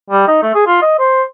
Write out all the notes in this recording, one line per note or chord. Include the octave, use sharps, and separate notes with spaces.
G3
D#4
A3
G#4
F4
D#5
C5